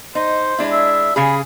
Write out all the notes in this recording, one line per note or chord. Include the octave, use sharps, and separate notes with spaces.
D#4 C5
G#3 D4 E4
E5
C#3 G#4 B5